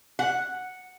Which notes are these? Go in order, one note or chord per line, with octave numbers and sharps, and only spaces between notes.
F#5